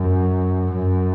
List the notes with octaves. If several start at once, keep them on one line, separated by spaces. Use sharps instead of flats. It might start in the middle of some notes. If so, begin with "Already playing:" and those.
Already playing: F#2
F#2